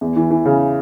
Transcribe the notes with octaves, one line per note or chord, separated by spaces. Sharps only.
E2
E3
E3
C#3